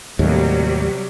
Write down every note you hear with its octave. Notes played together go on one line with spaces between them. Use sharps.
D#2 A2 C3 F#3 G3